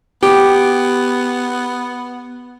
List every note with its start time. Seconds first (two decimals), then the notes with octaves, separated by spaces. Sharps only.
0.23 B3 G4